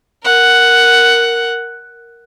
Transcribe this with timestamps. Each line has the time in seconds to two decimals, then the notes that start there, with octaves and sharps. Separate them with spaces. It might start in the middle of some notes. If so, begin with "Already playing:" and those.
0.24 A#4 F#5